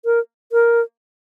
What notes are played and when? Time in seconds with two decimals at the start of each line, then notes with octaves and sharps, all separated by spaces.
0.05 A#4
0.52 A#4